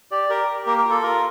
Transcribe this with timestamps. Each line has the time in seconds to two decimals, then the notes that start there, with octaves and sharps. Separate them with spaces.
0.11 G4 D5
0.30 G4 A#4
0.48 G4
0.66 A#3 A#4
0.78 A#4
0.85 F4
0.90 A4
1.03 F4 A#4